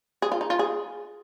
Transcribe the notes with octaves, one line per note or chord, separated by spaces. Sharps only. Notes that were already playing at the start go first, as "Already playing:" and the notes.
G#4
F4
D#4
F4
G#4